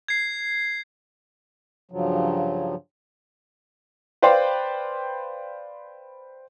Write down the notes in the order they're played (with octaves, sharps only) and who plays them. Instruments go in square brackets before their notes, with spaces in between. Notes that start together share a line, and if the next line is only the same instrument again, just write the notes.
[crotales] G#6 C7
[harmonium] G2 C#3 F3 F#3
[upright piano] B4 C5 D5 F5 G5 C6